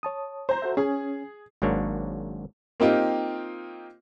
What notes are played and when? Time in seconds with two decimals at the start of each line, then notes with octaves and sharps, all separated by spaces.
0.03 C#5 A5 D#6
0.49 C5 A#5
0.62 F#4 A4 E5
0.77 C#4 G#4
1.62 G#1 G#2 F#3 A#3 D4 C#5
2.80 A#3 C4 D#4 F4 G4